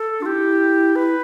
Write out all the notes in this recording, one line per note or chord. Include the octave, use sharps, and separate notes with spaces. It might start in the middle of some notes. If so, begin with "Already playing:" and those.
Already playing: A4
D4 F4
E4 G4
B4